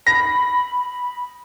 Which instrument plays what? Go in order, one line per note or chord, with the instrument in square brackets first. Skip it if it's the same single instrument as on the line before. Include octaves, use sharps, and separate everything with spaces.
[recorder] B5 [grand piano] A#6